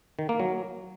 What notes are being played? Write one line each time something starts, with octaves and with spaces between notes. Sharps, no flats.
D#3
A#3
F#3